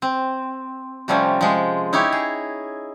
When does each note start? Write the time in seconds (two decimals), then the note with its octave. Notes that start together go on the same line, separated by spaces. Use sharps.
0.02 C4
1.08 C3 F3 G3 A3 C4 C#4
1.41 F3 G#3
1.93 D#4 E4 G4 C#5
2.12 G#4